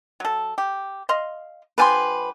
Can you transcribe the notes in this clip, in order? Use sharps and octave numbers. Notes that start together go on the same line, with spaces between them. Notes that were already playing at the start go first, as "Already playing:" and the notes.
F#3 A4
G4
D#5 F5 C6
D3 F3 G4 B4 G#5 C6